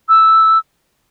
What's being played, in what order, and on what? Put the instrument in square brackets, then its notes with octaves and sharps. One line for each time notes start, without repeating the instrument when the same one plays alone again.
[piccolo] E6